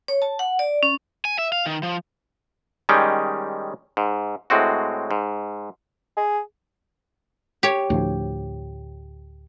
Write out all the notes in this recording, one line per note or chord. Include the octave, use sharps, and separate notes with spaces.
C#5
A5
F#5
D5
C#4
G#5
E5
F5
D#3
F3
D#3 G3 G#3 C#4 G5
G#2
A2 G#3 C4 F#4
G#2
G#4
G4 C#5
D2 A2 F3